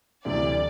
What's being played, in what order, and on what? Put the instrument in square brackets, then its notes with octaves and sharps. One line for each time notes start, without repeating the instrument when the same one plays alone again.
[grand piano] D2 C3 E3 G3 [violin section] D5